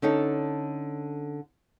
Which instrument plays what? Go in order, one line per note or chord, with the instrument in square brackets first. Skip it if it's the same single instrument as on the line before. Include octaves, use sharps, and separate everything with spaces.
[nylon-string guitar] D3 C#4 D#4 A4